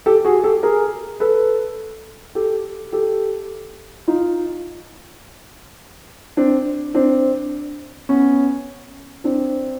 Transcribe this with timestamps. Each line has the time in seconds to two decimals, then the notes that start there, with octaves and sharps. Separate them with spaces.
0.06 G4 A4
0.25 F#4 G#4
0.44 G4 A4
0.63 G#4 A#4
1.20 A4 B4
2.35 G4 A4
2.92 G4 A4
4.07 D#4 F4
6.37 C4 D4
6.94 C4 D4
8.09 B3 C#4
9.24 C4 D4